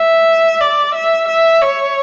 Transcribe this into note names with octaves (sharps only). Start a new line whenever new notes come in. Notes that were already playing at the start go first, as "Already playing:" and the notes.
Already playing: E5
D5
E5
E5
C#5